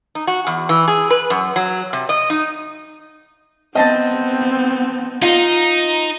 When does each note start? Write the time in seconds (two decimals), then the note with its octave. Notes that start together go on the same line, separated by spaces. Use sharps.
0.15 D#4
0.27 F#4
0.47 E2
0.69 E3
0.88 G#4
1.10 B4
1.30 F#2
1.56 F#3
1.93 C3
2.09 D#5
2.30 D#4
3.75 B3 C4 D#5 A5 A6
5.22 D#4 F4